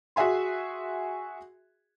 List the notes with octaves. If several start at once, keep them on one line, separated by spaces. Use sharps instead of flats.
F#4 G#4 E5 G#5 C6